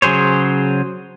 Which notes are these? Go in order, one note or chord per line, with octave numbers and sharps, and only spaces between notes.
C#3 F#3 G#4 C5 C#5